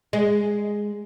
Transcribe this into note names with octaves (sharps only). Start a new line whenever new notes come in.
G#3